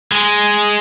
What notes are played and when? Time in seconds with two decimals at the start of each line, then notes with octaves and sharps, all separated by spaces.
0.12 G#3